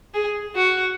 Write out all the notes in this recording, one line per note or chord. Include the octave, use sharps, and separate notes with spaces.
G#4
F#4